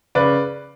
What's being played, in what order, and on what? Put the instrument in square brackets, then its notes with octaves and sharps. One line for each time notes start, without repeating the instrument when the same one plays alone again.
[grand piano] C#3 B4 D5